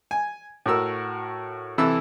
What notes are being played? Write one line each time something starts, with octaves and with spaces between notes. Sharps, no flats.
G#5
A2 F#4 A#4 E6
C3 E3 E4 A4 E6